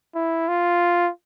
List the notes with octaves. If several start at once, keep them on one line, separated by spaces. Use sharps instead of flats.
E4
F4